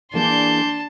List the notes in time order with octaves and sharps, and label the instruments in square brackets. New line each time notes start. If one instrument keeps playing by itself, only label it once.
[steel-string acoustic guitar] E3 A#3 G#4 [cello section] D4 [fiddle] A5 [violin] C6 G6